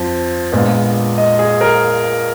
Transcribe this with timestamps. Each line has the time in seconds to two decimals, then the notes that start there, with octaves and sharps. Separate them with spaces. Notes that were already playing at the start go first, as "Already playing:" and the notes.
Already playing: F2 F3
0.52 A#1 A#2 G#3 B3
1.18 D#5
1.39 G#4
1.61 A#4